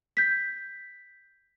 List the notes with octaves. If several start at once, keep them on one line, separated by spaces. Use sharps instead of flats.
G6 B6